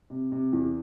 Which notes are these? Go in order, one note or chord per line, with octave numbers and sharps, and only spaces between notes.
C3
C3
E2